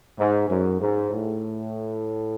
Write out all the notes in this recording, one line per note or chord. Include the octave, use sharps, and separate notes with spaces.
G#2
F#2
G#2
A2